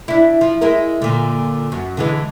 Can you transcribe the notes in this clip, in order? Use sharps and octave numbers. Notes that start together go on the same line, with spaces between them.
D4 E4
F3
G#3 E4 A#4
A#2 D3
F#2
D3 E3 G#3